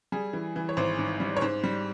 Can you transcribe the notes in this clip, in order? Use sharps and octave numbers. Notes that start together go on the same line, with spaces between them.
G3 G#4
E3
E3
C#5
G#1 C5
G#2
G3
C#5
G#2 C5
G3